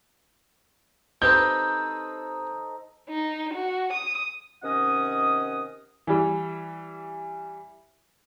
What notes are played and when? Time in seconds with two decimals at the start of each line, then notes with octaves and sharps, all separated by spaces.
1.22 C4 D#4 G4 A4 B4 C5 G6
3.09 D#4
3.54 F#4
3.92 D#6
4.63 C3 D#3 C#4 D#5 F#5 D#6
6.07 E3 G3